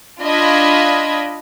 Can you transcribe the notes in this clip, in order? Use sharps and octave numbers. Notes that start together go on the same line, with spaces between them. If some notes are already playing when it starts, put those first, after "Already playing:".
D4 F4 D#5 B5 G#6